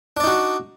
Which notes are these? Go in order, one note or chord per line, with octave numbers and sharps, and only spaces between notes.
D4 D#4 F#4 D5